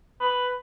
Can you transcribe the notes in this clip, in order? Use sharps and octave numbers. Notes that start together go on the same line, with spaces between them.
B4